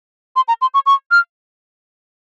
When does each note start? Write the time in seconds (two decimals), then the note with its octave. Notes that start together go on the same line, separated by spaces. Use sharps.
0.36 C6
0.48 A#5
0.62 C6
0.74 C#6
0.86 C#6
1.11 F6